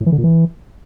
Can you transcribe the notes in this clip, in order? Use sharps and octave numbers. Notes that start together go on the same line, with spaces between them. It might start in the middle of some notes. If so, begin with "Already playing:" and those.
A2
E3
D3
A#2
E3